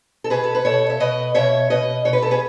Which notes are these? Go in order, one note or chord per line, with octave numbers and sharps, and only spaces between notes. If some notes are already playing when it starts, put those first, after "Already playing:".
A4
B2 G#4 B4
A4
B4
B2 A4 C#5
E5
B2 B4 D#5
B2 C#5 E5
B2 B4 D#5
B2 C#5
B4
A4
G#4 B4